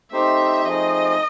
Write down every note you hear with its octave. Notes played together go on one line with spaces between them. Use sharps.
A3 C4 D#4 G4 C5 E5
F3 A3 C4 D#4 G#4 D#5